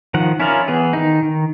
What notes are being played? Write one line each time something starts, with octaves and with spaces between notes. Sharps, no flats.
D#3 F3 F#5
C#4 E4 F4 A#4 D5
E3 B3 G#4
D#3 D#4
D#3